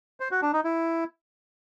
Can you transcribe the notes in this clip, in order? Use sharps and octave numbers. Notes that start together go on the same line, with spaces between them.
C5
F#4
D4
D#4
E4